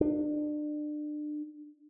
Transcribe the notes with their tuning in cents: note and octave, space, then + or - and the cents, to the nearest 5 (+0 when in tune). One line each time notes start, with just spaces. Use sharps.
D4 +30